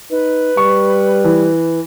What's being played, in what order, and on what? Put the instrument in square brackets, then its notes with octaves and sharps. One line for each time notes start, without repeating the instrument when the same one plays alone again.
[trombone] D#4 [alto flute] B4
[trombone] G3 [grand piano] C#6
[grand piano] E3